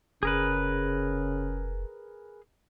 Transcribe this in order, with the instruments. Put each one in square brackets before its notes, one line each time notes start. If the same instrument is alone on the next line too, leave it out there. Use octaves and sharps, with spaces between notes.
[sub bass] F1 [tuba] C#3 [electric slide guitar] G#4 A#4 B4